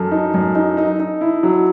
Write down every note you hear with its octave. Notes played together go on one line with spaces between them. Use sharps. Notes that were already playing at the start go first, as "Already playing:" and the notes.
Already playing: F#2 A4
D#4
F#2
D#4
D#4
D#4
E4
F#3